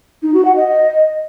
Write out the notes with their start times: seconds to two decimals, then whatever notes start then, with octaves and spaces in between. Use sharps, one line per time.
0.23 D#4
0.34 F#4
0.45 F#5
0.56 D#5